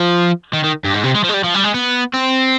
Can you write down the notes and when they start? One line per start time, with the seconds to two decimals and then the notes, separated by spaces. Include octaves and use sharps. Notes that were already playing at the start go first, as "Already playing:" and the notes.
Already playing: F3
0.54 D#3
0.64 D#3
0.85 G2
0.94 G#2
1.04 C3
1.15 G#3
1.24 F3
1.29 G#3
1.34 G3
1.44 F3
1.54 G3
1.64 G#3
1.74 B3
2.14 C4